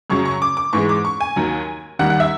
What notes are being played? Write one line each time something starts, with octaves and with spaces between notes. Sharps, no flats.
F#2 C#3 F#3 C#6
C#6
D6
D6
G#2 E3 G#3 C#6
D6
C#6
G#5
D#2 D#3 F#3
D#2 D#3 G3 F#5
F#5
E5